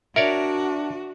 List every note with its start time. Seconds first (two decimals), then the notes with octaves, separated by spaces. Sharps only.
0.16 D4 F#4 A#4 C#5 D5 E5